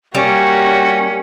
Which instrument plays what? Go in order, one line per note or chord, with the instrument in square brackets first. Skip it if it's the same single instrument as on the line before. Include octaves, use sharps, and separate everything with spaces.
[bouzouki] G3 [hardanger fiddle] A#3 [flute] C#4 [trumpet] F#4